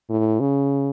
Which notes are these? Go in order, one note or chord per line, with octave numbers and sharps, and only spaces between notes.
A2
C#3